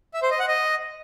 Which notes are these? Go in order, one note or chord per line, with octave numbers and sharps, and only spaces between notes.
E5
C5
D#5
F#5
D#5